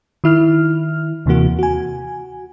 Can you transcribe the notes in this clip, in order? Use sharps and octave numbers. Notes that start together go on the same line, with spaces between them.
D#3 E4 F6
D#2 C3 E3 A#3 F#4
F#4 G#5